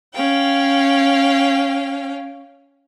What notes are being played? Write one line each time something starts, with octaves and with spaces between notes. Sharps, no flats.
C#4 F5 G5